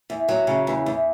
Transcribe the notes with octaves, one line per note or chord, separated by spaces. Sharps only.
E2
F#3
C#3
E2
E2